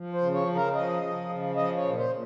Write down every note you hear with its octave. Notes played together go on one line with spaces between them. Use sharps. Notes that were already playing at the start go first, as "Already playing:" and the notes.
Already playing: F3
C5
C#3
C#5
C#3
A#4
F3 D#5
F3
C#3
F3 D#5
C#5
A#2
C5
A#2